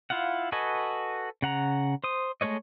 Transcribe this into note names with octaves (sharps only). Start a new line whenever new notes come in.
E4 F4 F5 F#5
F#4 A4 B4 D#5 G#5
C#3 F#5 A#5
C5 D#6
G#3 A3 B4 C#5 D#5